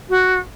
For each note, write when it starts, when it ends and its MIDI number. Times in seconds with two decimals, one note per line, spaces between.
0.09 0.38 66